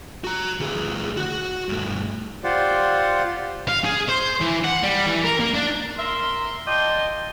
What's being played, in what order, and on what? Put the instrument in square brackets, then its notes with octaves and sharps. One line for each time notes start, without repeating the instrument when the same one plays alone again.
[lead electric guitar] F#4 A#5
D2 G#4
F#4 F#5
G2 A3
[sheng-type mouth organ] F4 G4 C5 D5 F#5
[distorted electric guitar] F5
G#4
C5
E3
F#5
G3
E3
A#4
A#3
D4
[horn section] A#4 E5 C6
F4 D5 D#5 G5 A5 C6